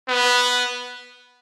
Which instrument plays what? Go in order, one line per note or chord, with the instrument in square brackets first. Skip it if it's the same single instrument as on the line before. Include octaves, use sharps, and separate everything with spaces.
[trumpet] B3